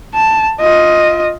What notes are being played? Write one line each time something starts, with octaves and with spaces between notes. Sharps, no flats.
A5
F4 D#5